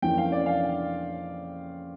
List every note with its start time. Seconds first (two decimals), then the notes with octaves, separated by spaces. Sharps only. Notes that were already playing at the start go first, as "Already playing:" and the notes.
0.02 F2 E3 A#3 C#4 G5
0.18 F5
0.32 D5
0.46 F5